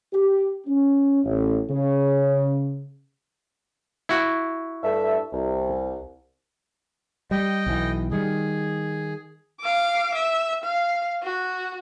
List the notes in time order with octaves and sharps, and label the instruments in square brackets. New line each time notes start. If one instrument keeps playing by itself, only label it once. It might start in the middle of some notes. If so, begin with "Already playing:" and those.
[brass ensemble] G4
C#4
A1
C#3
[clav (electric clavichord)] E4 F#4
[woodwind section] G2 A4 E5
C2
[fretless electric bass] G3 [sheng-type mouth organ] D#5 G5
[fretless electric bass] B1 E3
[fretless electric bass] D#3 G3 [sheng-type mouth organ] G#4
[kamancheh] F5 D6
E5
F5
F#4